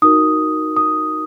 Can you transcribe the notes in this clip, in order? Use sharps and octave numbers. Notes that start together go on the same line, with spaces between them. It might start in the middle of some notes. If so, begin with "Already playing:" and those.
D#4 F#4 A#4 D#6
D#6